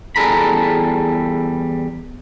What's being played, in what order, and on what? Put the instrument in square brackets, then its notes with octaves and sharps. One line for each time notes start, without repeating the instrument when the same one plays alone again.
[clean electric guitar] E2 G3 G#4 A4 A#5 B5